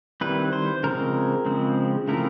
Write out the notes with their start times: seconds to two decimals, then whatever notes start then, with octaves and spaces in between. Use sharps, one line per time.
0.21 D#3 G3 C4 E4 B4
0.53 C5
0.83 C#3 F3 G#3 C4 A#4
1.46 C#3 F3 G#3 C4
2.08 C#3 F3 A3 C4 E4 A#4